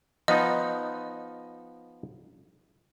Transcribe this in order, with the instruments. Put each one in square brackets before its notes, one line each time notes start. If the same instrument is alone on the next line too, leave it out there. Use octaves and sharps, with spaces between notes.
[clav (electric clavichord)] F3 B3 D#4 [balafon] D#5